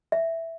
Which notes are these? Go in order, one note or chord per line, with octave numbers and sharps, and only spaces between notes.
E5